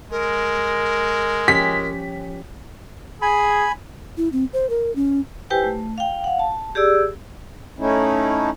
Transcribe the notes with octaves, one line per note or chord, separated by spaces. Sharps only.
G#3 A#4
F3 C#4 G4 B6
G#4 G#5 B5
E4
C4
C5
A#4
C#4
E4 G4 B4 C5 G5 G#5
A3
F5 G5
F5 F#5
A5
G4 G#4 D5 E6
A3 C#4 D#4 E4